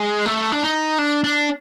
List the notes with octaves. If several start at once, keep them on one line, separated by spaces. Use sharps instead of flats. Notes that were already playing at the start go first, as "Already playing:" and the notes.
Already playing: G#3
A3
D4
D#4
D4
D4